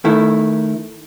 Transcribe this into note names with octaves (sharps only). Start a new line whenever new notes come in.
D#3 A3 E4